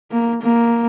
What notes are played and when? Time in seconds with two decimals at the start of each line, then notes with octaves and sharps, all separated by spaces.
0.11 A#3
0.42 A#3